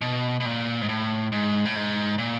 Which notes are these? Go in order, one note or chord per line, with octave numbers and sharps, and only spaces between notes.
B2
B2
A#2
G#2
A2
G#2
A2
G#2
A#2